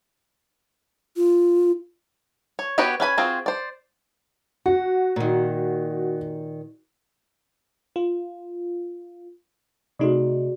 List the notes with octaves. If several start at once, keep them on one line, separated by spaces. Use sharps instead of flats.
F4
C#5
B3 F#4 G4 B4 C#5
C#4 B4 G#5 B5
C4 F4 F#4 G#4 C5
C5 D5
F#4 F#5
A#2 D#3
F4
C3 A3 D#4 F#4 G#4 D5